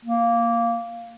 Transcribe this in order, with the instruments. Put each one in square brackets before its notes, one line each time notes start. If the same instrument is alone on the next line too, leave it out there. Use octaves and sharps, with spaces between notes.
[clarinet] A#3